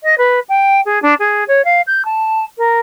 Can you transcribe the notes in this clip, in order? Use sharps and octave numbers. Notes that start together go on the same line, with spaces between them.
D#5
B4
G5
G#4
D4
G#4
C#5
F5
G6
A5
A#4